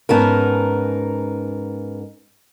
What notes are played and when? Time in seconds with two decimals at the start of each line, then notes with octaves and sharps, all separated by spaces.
0.09 G#2 B3 C#4 D#4 A#4 A5